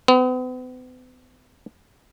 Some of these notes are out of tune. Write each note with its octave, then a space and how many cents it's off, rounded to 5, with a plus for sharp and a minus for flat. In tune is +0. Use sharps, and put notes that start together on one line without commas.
B3 +45